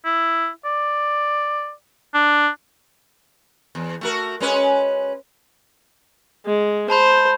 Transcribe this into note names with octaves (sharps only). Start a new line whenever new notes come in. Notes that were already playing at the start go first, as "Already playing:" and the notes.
E4
D5
D4
E2
A3 F#4 A#4
G#3 C#4 B4
G#3
C5 A5 B5 G6